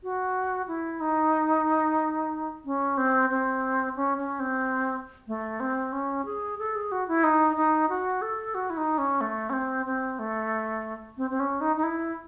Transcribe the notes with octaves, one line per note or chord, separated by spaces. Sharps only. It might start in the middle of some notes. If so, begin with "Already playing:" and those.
F#4
E4
D#4
C#4
C4
C4
C#4
C#4
C4
A3
C4
C#4
G#4
A4
G#4
F#4
E4
D#4
D#4
F#4
A4
F#4
E4
D#4
C#4
A3
C#4
C4
C4
A3
C4
C4
C#4
D#4
D#4
E4